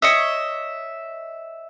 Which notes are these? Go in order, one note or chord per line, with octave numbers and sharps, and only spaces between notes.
C#5 D#5 E5